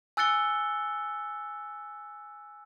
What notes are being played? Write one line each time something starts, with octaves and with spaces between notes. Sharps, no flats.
G#5 E6 F#6 A6 C#7 G7